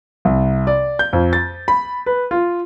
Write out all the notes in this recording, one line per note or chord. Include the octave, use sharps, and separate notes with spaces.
C2
D5
G6
F2
A6
B5
B4
F4